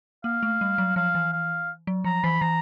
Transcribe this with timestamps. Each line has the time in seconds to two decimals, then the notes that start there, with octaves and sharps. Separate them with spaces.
0.24 A#3 F5
0.43 A3
0.61 G3
0.78 F#3
0.96 F3 F5
1.15 E3
1.33 F5
1.87 F#3
2.04 F3 A#5
2.23 E3 B5
2.41 E3 A#5